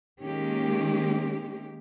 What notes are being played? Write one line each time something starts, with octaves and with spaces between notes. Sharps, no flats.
D#3 G#3 A#3 C#4 G4